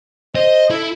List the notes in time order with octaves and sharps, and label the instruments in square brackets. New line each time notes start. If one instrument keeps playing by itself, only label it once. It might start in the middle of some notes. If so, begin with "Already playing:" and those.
[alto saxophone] C5 [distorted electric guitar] D#5
[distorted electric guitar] E4 E5 [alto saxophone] A4